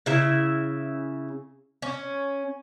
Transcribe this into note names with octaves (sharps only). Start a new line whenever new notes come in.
C#3 E4 E5
C#4